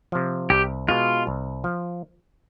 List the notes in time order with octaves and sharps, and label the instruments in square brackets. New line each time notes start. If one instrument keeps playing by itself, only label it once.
[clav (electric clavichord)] C3 F3
[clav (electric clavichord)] C2 [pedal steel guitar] G4
[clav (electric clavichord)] B2 G#3 [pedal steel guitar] F4
[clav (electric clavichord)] C2
F3